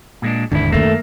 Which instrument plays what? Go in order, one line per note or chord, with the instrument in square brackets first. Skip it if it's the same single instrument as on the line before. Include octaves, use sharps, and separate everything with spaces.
[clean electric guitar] A#2 G#3 D4
[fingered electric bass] E1 D#2 D3 [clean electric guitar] G#2 E4
[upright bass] F#2 D#3 [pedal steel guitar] A3 [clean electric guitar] A#3